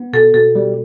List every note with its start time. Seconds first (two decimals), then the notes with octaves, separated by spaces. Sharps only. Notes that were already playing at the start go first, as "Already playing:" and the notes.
Already playing: B3
0.13 B2 A4
0.34 B2 A4
0.55 G3